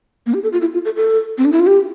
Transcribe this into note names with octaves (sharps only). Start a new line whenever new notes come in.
A#3
G4
A4
F4
E4
F4
A4
A4
C4
D4
E4
F4
G4